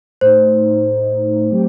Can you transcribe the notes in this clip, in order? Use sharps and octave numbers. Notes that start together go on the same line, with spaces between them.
A2 A3 D#4 C5
F#3 A3 C4 G4